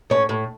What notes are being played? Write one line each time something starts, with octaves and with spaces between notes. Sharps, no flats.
A2 C#4
A2